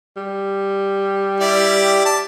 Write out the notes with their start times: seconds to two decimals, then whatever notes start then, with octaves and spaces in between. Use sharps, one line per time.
0.17 G3
1.40 E4 G4 D5
2.05 D5 A5